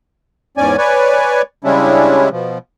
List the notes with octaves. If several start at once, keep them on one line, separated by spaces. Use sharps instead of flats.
E2 G#2 C#4 D5 G#5
B4 C#5 D5 G#5
C#3 G3 G#3 C#4 D4 E4
B2 F3